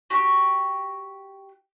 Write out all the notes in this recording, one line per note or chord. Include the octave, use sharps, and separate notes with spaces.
F#4 G4 G5